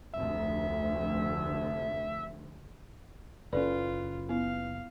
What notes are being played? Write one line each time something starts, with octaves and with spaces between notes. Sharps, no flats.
F1 D2 E5
F#1 C#4 F4 A4 B4 D5
B3 E4 F5